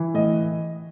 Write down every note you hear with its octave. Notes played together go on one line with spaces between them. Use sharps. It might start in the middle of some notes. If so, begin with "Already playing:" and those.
Already playing: E3
A2 D#5